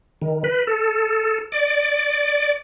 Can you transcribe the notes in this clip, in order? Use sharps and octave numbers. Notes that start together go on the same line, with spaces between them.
D#3
B4
A4
D5